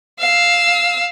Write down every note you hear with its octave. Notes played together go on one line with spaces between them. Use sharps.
F5 E6